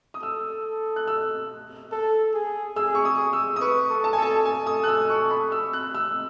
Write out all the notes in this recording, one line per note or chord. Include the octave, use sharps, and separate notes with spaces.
D#6
A4 E6
F#6
E6
A4
G#4
G#4 E6
C#6
D#6
E6
D#6
B4 C#6
A4
A5
G#5
A4 A5
A4 G#5
D#6
F#6
E6
C#6
B5
E6
F#6
E6